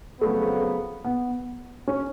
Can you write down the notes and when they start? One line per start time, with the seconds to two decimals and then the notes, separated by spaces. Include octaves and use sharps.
0.21 F2 C#3 F#3 A3 B3
1.04 B3
1.88 C#4